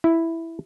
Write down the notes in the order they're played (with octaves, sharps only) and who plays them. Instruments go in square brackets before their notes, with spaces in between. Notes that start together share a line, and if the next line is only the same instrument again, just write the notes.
[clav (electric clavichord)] E4